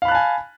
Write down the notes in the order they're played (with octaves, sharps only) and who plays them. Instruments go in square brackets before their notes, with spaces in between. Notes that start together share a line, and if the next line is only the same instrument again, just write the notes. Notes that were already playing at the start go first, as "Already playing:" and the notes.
[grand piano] F5
B5
F#6
A5
G#5